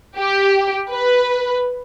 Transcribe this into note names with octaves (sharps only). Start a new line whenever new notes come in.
G4
B4